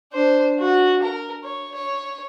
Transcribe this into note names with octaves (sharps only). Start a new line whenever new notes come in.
D4 C5
F#4
A#4
C#5
C#5